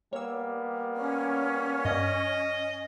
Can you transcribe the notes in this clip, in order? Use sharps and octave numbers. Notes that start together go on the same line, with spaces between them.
G3 A#3 B3 C#5 E6
C#4
G2 D#5